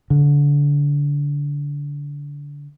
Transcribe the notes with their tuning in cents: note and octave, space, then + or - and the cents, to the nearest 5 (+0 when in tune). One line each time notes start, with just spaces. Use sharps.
D3 -25